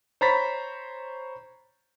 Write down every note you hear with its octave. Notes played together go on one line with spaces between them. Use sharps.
C5 C#5 A#5 B5 A6 B6